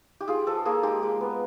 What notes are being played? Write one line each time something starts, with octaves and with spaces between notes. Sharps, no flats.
G4
F4 G#4
F3 A4
A#3 G#4
G#3 G4
G#3
B3